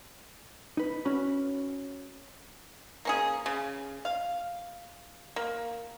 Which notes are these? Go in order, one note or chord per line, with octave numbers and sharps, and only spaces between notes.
D#4 B4
C#4 F#4 B5
A#3 C#4 G#4
C#3
F5
A#3